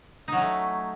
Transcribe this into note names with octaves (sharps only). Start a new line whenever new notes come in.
F#3 A3 C#4 D#4